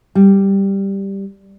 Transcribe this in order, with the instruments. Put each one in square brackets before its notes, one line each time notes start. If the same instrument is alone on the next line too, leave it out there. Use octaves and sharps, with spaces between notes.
[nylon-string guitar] G3